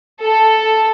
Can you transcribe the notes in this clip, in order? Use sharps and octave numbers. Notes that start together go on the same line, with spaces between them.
A4